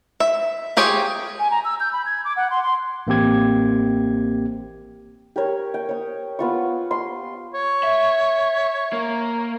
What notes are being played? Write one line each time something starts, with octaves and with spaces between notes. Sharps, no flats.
E5
F4 G4 G#4 C#5
G#5
A#5
E6
G6
B5
G#6
D6
F#5
C6
C6
A1 A#3 C4 G4 G#6
G4 A#4 C#5
G5
C#5 D#6
B3 F4 C#6
C6
C#5
E5
A#3